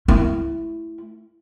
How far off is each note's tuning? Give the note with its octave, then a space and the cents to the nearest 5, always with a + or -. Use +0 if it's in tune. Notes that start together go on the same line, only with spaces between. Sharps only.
A3 +0 E4 +5